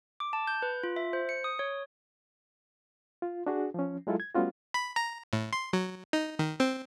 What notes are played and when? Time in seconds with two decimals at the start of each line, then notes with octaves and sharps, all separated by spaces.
0.20 D6
0.33 A5
0.47 G6
0.62 B4
0.83 F4
0.96 E5
1.13 C5
1.29 C#7
1.44 D#6
1.59 C#5
3.22 F4
3.47 D4 F#4 G#4
3.74 F3 C#4
4.07 F#3 G#3 E4 F4 A4
4.20 G#6
4.35 G3 A3 B3 C#4 F4 F#4
4.74 B5
4.96 A#5
5.33 A2
5.53 C6
5.73 F#3
6.13 D#4
6.39 D#3
6.60 C4